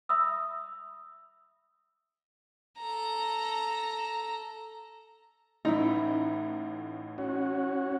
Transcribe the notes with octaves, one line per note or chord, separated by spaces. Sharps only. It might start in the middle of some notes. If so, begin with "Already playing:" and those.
E5 B5 D#6 E6
A4 A#5
A1 A2 D#4 E4
C#4 F#4